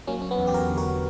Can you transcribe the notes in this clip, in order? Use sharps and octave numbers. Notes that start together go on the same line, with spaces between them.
F#3 A#3 C#4
C#4
B3
E2
G4
F#4 A#4
D3
F#4 A#4